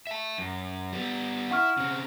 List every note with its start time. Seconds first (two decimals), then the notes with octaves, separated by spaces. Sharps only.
0.07 E5 A5
0.38 F#2
0.93 G3 B3
1.51 E4 F#5 C#6 F6
1.77 C#3 C4